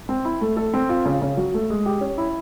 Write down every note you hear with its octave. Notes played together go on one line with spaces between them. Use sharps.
C4
E4
A3
A4
C4
F4
C#3
C#3
F#3
A3
G#3
G4
C#4
E4